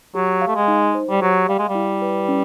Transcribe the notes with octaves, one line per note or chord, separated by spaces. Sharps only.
F#3 G4
F5
A3
G#3
D#4
C5
G3
F#3 G4
G3 F5
G#3
G3
E4
B4
C#4